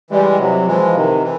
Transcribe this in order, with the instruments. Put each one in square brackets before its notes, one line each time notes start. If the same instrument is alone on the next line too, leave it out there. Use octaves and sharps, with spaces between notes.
[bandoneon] E3 G#3 [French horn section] G3
[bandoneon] C3 [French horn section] F#3
[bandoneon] E3 G#3 [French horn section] F3
[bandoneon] C3 [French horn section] D#3
[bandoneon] E3